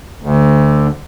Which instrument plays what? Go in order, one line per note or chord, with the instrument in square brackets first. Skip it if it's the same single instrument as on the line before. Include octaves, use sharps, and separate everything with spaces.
[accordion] D2